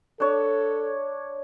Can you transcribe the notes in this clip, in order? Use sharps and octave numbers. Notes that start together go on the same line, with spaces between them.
D4 A4 C#5